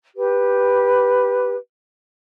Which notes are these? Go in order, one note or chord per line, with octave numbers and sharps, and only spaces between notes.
G4 B4